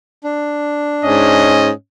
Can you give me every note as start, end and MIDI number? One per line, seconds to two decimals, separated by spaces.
0.24 1.52 62
1.05 1.70 44
1.05 1.72 61
1.05 1.72 75